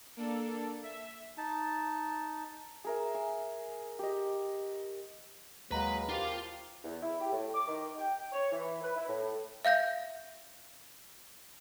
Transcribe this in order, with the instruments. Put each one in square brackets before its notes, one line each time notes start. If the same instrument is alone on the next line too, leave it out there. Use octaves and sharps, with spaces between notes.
[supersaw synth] A#3 D4 A4
E5
[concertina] D#4 A5
[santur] G#4 A#4 E5
G#5
G4 D#5
[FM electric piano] D#2 A#5 [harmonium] F#3 G#3 A#3 [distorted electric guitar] B4
[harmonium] F3 G4 A#4 [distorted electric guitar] F4 F5
[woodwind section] E2
E4
G4
A2
D6
D#3
G5
C#5
E3
B4
E4
A2
[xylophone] E5 F5 G6 A#6